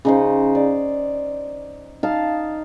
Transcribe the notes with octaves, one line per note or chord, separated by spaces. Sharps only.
C#3 D#4 C5
D5
D#4 F5 A5